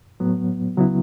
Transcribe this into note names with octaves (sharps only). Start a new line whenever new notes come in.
A2 F#3 B3
C#2 C#3 F#3 B3 E4